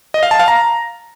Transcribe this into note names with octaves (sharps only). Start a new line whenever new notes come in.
D#5
F5
A5
F5
A#5